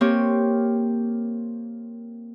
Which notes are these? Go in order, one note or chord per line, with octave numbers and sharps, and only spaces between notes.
A#3 C4 G4 C#5